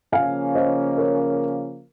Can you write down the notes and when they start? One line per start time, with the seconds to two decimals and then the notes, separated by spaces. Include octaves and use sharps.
0.12 C#3 F3 A#3 C#4 F5 G#5
0.55 C5 D#5
0.98 A#4 C#5